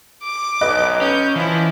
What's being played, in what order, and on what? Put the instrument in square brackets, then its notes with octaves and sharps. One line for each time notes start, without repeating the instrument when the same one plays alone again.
[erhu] D6
[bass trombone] B1 [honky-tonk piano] B4 D#5 F#6
[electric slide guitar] C#4 [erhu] G6
[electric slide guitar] E3 [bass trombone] F3 [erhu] E4